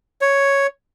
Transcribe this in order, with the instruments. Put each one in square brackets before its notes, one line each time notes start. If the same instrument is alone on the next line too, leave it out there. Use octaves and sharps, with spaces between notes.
[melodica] C#5